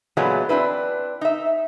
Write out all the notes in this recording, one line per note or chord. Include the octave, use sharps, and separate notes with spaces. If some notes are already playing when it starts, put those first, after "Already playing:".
A#2 E3 F#3 G#3 A3 B3
C4 D4 E4 B4
D#4 E5